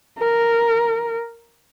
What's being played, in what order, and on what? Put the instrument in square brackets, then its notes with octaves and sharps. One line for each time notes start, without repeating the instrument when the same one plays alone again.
[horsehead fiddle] A#4